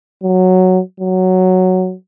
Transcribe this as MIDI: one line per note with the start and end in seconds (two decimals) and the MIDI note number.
0.23 0.80 54
1.00 1.94 54